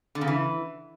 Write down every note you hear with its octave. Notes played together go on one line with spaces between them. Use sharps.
D3
C#3
E3